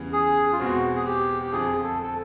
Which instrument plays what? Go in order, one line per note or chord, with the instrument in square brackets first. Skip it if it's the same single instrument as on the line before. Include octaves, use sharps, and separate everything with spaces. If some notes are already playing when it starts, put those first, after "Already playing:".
Already playing: [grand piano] E2 C#3 E3 G3
[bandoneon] G#4
F4
[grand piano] E2 B2 G#3 C4 [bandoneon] F#4
[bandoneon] G#4
G4
G4
[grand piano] F2 D3 F3 [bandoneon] G#4
[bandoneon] A4
A4